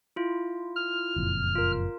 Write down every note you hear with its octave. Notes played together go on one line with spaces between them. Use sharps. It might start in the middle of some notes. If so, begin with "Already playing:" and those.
E4 F4
F6
F#1 F2 A#2
F4 A#4